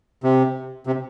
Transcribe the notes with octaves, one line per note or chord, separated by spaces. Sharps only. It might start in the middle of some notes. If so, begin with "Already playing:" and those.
C3
C3